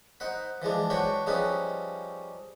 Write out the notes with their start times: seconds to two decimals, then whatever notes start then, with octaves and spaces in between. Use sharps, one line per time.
0.20 D#4 C5 F#5 B5
0.62 E3 F3 G#3 D4
0.90 D4 F#4 B4 C#5 G5
1.27 F3 G3 C#4 D#4 G#4 B4